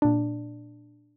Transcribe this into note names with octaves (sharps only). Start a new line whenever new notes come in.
A#2 D4